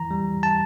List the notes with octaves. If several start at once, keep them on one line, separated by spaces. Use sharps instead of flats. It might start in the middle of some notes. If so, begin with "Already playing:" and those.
Already playing: E3 A#5
G3
A5